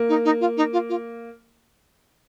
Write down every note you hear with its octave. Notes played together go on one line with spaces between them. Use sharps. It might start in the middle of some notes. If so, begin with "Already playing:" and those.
Already playing: A#3
D#4
D#4
F4
D#4
F4
F4